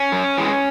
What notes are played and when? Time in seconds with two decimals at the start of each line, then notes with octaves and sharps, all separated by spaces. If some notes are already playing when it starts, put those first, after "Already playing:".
Already playing: C#4
0.12 F#2
0.37 E3 G#3